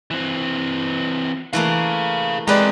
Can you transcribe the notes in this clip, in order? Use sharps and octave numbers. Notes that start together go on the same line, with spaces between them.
E3 C4
E3 A3 A#3 G#4 F5
G#3 C4 G4 B4 D5 A#5